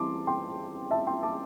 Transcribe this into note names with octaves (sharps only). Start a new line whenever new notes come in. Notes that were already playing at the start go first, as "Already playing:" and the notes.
Already playing: E3 G3 C4 A5 C6 D6
G5 C6
E5 A5
G5 C6
A5 D6